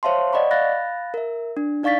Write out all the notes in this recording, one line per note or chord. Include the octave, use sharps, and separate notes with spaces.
C5 C#5 E5 F5 A5 C6
D5 D#5 F#5 B5 C#6
F5 B5 F#6 A6 A#6
A#4 E5
D4
D#4 D5 F5 C#6 A6 B6